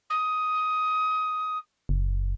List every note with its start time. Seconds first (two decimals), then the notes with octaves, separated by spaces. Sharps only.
0.10 D#6
1.89 F#1